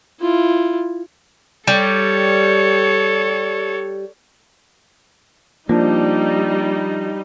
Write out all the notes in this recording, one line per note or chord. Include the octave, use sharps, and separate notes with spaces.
E4 F4
G3 A4 C#5
F3 G3 A#3 D4 D#4